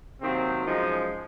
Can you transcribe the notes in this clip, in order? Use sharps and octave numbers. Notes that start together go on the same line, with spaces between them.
C3 D#3 F#3 A#3 C4
F#2 F3 G#3 D#4